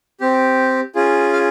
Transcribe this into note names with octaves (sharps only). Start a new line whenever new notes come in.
C4 G4
C#4 F4 G#4
F5